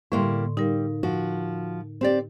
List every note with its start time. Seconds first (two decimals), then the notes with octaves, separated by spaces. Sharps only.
0.12 A2 D3 G3 A#3 E4 C6
0.57 G3 D#4 A#4 F5
1.03 F3 F#4
2.01 C4 G4 D5